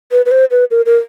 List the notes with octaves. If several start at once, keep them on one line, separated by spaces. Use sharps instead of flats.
B4
B4
C5
B4
A#4
A#4